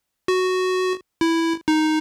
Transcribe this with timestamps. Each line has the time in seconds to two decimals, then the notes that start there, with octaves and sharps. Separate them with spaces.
0.28 F#4
1.21 E4
1.68 D#4